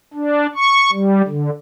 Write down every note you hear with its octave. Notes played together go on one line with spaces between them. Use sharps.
D4
C#6
G3
D3